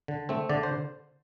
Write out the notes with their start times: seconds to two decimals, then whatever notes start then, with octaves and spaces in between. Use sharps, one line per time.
0.08 D3
0.29 A3 C4
0.49 D3 D5
0.63 C5